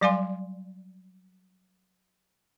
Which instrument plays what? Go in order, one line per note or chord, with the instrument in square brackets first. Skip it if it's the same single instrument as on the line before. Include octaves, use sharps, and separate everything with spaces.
[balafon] F#3 G3 D5 F5 G#5 C6